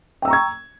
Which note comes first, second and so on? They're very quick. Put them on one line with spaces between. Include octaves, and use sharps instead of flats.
G5 E6 A#5 C#6 G#6